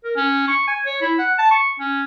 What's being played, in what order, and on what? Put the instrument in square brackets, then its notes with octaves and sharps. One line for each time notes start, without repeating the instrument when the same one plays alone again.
[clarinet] A#4
C#4
C#6
G#5
C#5
E4
F#5
A5
C#6
C#4